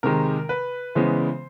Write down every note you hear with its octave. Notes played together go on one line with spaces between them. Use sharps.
C3 D#3 G#3 A#4
B4
C#3 E3 G#3 B3 C5